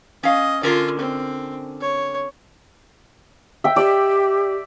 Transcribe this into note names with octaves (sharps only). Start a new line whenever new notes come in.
C#4 D#5 F5
D3 C#4 F4 A#4
C4
C#5
E5 G5
G4 D5